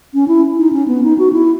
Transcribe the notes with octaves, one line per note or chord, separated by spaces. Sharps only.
C#4
E4
D#4
C#4
B3
D#4
F#4
E4